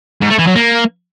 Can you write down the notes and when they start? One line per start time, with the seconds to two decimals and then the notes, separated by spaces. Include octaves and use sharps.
0.21 G#2
0.30 A3
0.39 E3
0.47 F#3
0.56 A#3